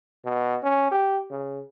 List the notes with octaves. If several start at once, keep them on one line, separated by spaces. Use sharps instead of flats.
B2
C#4
G4
C#3